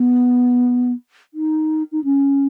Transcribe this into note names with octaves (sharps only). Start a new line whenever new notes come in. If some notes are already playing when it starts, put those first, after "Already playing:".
Already playing: B3
D#4
D#4
C#4